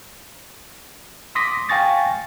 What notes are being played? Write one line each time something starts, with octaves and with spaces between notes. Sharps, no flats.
C6 D6 D#6 A#6 B6
F5 G5 G#5 C#6 A6 A#6